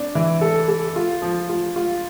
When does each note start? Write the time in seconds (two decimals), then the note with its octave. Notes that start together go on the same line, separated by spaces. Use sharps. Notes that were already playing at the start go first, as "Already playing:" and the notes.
Already playing: C4 D4
0.15 E3
0.41 A4
0.68 A4
0.96 F4
1.22 F3
1.49 F4
1.76 F4